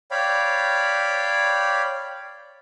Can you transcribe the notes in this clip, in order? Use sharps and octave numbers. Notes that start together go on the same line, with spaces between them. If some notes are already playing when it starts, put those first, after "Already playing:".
C#5 D5 F5 G5 B5